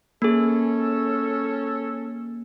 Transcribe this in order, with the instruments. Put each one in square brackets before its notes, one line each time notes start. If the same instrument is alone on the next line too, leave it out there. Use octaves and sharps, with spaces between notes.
[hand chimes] A#3 G#4 [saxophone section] C#4 A4